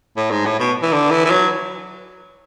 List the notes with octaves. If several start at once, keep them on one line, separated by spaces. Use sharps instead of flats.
A2
G#2
A2
B2
E3
D3
E3
E3
F#3